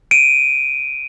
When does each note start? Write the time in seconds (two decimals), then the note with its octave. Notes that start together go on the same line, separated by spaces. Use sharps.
0.11 D7 D#7